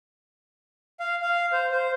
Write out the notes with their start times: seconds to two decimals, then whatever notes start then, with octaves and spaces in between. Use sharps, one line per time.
1.00 F5
1.22 F5
1.52 C5
1.72 C5